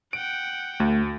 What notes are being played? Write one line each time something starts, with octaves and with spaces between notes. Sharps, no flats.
F#5 G5 D7
D2 A3